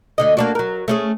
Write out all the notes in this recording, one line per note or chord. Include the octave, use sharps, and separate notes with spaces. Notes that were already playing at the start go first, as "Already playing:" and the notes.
D2 D3 D#5
A#3 D4 F#4
F#3 A#4
A3 C#4 G#4